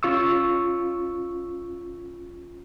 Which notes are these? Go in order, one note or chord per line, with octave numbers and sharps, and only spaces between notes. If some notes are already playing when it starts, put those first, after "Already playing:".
C#4 F4 C#6 E6